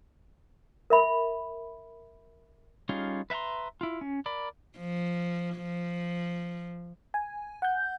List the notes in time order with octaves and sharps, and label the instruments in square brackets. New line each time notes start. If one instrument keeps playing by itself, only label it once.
[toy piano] A#4 E5 B5
[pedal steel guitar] G3 C#4 D#4 F4 G#4
B4 E5 F#5 A#5 C6
E4 F4
C#4
A#4 D5 B5
[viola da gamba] F3
F3
[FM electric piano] G#5
F#5 G6